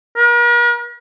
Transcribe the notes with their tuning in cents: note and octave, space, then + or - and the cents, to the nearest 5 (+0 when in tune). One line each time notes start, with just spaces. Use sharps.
A#4 +45